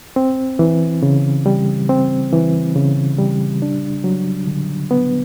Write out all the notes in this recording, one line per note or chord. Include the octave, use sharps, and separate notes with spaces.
C4
E3
C#3
G3
C4
E3
C#3
G3
D4
F#3
D3
B3